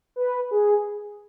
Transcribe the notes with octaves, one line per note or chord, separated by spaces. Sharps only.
B4
G#4